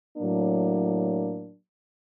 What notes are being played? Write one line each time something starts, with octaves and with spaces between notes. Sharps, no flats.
A2 F#3 A#3 D4